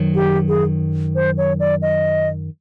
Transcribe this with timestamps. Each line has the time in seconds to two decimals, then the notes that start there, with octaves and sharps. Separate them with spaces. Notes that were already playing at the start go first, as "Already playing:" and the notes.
Already playing: F#2 D#3 F#3
0.15 G4
0.48 G#4
1.15 C5
1.37 C#5
1.60 D5
1.82 D#5